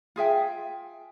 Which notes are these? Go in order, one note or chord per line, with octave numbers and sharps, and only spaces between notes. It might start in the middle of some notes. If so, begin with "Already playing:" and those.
F4 G#4 E5 G5